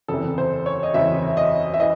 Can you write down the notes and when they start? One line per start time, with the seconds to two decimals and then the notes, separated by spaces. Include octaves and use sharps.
0.08 F#1 E2 C3 A4
0.38 C5
0.66 C#5
0.83 D#5
0.94 F#1 E2 C3 E5
1.37 D#5
1.74 E5
1.80 E3 D#5